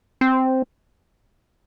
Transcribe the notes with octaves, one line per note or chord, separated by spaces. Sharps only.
C4